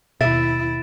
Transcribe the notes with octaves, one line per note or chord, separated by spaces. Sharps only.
D#2 B2 E4 E5 A6 D7 E7